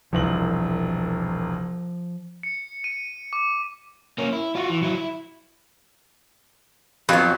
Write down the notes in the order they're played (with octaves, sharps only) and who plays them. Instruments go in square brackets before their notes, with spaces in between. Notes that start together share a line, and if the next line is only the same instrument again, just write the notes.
[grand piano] E1 C2 F#7 [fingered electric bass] F3
[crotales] C#7
D#7
D6
[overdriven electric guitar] A#3 C#4
E4
F4 F#4
E3
F#3 E4
E4
[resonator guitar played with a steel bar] F2 [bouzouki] F#3 B3